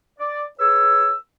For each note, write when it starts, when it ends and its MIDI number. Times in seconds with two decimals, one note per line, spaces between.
0.19 0.44 74
0.60 1.15 68
0.60 1.15 71
0.60 1.15 73
0.60 1.15 88